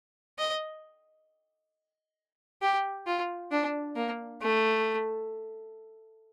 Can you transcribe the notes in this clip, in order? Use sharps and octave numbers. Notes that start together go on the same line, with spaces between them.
D#5
G4
F4
D4
A#3
A3